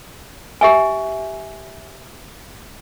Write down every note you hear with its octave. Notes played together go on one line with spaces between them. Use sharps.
G4 E5 G#5